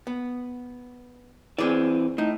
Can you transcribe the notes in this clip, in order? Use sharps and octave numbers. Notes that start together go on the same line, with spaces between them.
B3
E3 C4 G#4 D5
A2 D#4